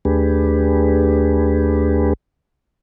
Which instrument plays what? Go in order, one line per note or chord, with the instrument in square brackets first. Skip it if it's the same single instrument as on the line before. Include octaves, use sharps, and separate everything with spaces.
[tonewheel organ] D#2 A3 D4 G4 G#4 B4